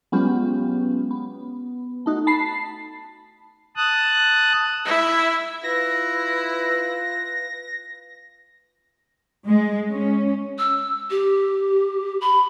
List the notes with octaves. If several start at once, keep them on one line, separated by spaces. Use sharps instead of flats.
F#3 G#3 B3 C#4 F4 G4
B3
A3 D#4 F#4
A5 B5 C7
A5 D#6 F#6
E4
E4 F4 B4 A#6
G#3
C#4
E6
G4
B5